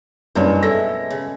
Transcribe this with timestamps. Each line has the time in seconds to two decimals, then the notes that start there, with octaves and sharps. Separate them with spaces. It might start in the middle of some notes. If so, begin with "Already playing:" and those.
0.35 F#1 G2 B2 G#3 C#4
0.63 G#3 E4 A4 A#6
1.10 C#3